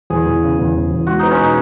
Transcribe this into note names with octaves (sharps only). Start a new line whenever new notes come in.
E2 G#4
E2
C#3
E2
E2
E2
G#3 F#4
B3 D#4
C#4
B2 D#4